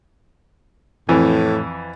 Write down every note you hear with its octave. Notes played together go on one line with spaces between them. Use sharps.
F2 A2 E3